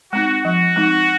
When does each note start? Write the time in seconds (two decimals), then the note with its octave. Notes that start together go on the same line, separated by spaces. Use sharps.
0.13 G#3 C4 D#4 F#4
0.44 F3 F#4
0.76 G#3 C4 D#4